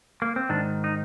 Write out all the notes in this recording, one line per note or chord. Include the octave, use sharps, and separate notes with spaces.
A#3
C4
G#2 D#3 D4
D#4